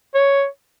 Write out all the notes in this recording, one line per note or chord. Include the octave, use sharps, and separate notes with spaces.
C#5